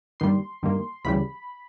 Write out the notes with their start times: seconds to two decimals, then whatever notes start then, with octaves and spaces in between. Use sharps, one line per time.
0.20 G2 D#3 G3 A#3 C6
0.63 G2 D#3 G3 A#3
1.05 D2 C#3 E3 G3 B5